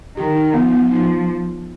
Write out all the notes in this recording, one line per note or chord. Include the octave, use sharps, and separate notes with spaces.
D#3 G4
D#4
F3 B3
B3
F3 D#4